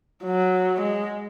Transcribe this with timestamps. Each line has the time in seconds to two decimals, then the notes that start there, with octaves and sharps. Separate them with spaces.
0.24 F#3
0.81 G#3